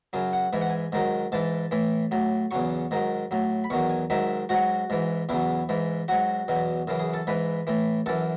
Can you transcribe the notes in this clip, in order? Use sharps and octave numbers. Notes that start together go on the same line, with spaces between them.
F#2 C#3 F#3 G#5
F#5
G#2 E3 G#5
F#5
G#5
G#2 D#3 F#3
G#2 E3 A5
A2 E3
A2 F#3
E2 C#3 F#3 C#6
G#2 D#3 F#3
A2 F#3
B5
E2 D#3 F#3 C#6
G#5
G#2 D#3 F#3 E5
G#2 F#3 F#4
G#2 E3
E2 C#3 F#3 E4
G#2 E3
G#2 F#3 F#4
E2 B2 F#3
F#2 C#3 E3
G#4
A4
G#2 E3 B4
A2 E3
F#2 E3 A4